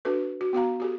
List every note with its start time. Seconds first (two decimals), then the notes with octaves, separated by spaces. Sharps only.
0.05 D4 F#4 A4 B4
0.41 F#4
0.53 B3 F#4 F5 A#5
0.80 F#4 G4 A4